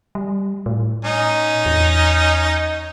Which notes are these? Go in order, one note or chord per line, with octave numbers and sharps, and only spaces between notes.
G3
A2
C#4 D#4
E2